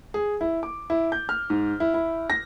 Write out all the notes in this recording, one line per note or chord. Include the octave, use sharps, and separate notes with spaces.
G#4
E4
D6
E4
G6
F6
G#2
E4
E4
A#6